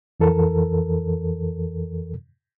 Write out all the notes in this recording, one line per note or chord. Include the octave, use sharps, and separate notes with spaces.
F2 E3 A4 A#4